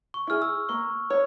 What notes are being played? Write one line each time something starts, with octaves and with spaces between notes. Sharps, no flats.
C#6
E4 G#4 F6
E6
A#3 C#6
C#5